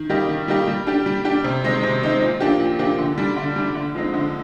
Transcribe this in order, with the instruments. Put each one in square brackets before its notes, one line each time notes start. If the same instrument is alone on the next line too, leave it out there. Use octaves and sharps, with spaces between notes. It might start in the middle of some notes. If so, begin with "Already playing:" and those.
Already playing: [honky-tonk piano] D#3
G3 A#3 D#4 G4
D#3
G3 A#3 D#4 G4
G3
D4 G4
G3
D4 G4
C3
D#3 G#3 C4 D#4
C3
D#3 G#3 C4 D#4
A#2
F3 A#3 D4 G4
A#2
F3 A#3 D4 G4
D3
G3 D4
D3
G3 D4
D3
F3 G#3 C4 D#4
D3